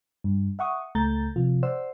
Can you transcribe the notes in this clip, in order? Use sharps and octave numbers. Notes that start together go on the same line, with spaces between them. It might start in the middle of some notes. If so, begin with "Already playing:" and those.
G2
E5 F#5 C#6 D#6
C#2 A3 A#5 G6 A6
C3 F3 F4
C5 D5 F#5 C6 E6